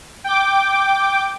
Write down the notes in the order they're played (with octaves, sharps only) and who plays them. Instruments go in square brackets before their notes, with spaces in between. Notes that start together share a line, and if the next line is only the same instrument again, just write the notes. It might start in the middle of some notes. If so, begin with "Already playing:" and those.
[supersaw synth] G5 D6